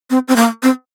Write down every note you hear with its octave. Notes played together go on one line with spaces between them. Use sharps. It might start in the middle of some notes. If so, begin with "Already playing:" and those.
C4
C4
A#3
C4